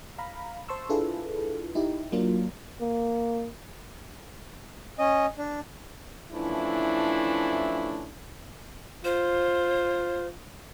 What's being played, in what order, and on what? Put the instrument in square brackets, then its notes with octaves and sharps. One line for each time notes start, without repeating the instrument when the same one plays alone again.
[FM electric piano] F5 A#5 B5
C5 A5 C6 C#6 E6
D4 E4 F4 G#4 A4 B4
D#4 E4 G4
F#3 A#3 D4 F4 A#4
[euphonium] A#3
[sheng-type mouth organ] C#4 D#5
D4
[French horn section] E3 F3 A3 C#4 D4 E4
[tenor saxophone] F4 [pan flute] C5